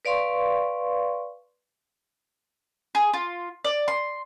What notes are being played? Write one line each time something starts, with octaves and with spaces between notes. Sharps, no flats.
B4 D5 F5 C6 C#6
G#4
F4
D5
C6